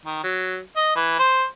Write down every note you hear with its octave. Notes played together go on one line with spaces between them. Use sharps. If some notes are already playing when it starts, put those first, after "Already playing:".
D#3
F#3
D#5
E3
C5